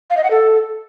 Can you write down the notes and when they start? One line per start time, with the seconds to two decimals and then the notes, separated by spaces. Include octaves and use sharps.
0.10 F5
0.17 D#5
0.24 F#5
0.31 A4